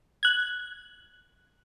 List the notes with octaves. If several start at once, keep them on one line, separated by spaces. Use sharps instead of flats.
F#6 G#6